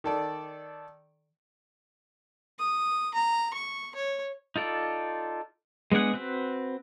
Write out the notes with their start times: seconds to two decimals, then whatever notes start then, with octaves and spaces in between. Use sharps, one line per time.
0.04 D#3 A4 D5
2.59 D#6
3.14 A#5
3.54 C#6
3.95 C#5
4.56 D#4 F4 A4 D5
5.92 G#3 B3 D4 G#4 F#5
6.14 C4 F#4 B4